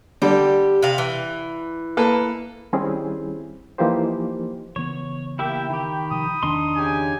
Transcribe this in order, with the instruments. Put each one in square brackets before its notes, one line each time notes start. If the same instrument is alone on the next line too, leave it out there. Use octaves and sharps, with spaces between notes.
[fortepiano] D3 G3 [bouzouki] G4
[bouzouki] C3 F5
E3
[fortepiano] A#3 A4 B4
[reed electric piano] D#3 G3 C4 C#4 E4 G#4
E3 F3 A#3 D#4 G4 C5
[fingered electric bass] C#3 E3 B3 [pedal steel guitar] C#5
[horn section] A#3 G5 [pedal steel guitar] E4 G4 E5
[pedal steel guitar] D#3 G4 [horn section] G5 B5
[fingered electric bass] C3 F3 [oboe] D#6
[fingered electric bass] E2 D#3 [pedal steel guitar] D4 D#4 C6
[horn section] C#3 G4 G#5